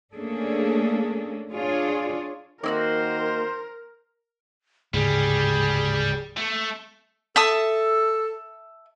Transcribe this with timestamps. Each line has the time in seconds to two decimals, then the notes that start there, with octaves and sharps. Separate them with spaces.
0.15 A3 A#3 C#4 D4 G#4 A4
1.54 D4 F4 G#4 C#5 D5
2.64 D#3 A#3 E4 F#4 A#4 C5
4.94 D1 G#2 C#3 G3 G#4
6.38 A3
7.36 A4 E5 A5 D#6